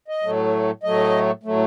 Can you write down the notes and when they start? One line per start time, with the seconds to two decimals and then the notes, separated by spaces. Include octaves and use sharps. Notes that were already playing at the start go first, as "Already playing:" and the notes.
0.08 D#5
0.23 A2 F#3 A3
0.83 A2 F#3 A3 D#5
1.43 A2 F#3 A3